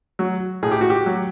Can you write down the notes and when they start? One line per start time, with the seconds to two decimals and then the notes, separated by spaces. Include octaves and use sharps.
0.19 F#3
0.63 A2 G#4
0.71 G4
0.81 F#4
0.90 G4
1.06 F#3